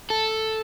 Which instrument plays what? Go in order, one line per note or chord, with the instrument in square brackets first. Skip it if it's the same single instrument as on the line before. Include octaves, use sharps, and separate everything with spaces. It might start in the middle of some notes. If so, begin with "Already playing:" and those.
[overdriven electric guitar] A4